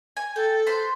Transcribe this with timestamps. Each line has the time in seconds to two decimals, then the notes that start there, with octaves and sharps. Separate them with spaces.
0.17 G#5
0.36 A4 G5
0.67 B4 C5 C6